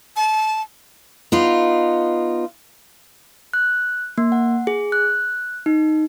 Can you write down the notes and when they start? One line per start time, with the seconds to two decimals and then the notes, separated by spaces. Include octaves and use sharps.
0.16 A5
1.32 B3 D#4 F4
3.53 F#6
4.18 A#3
4.32 F#5
4.67 G#4
4.92 F#6
5.66 D#4